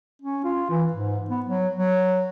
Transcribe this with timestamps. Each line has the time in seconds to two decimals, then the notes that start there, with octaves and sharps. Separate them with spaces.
0.22 C#4
0.44 F4
0.70 E3
0.93 G#2
1.30 B3
1.46 F#3
1.76 F#3